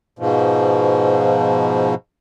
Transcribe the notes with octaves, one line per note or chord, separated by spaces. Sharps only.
G#2 B2 F3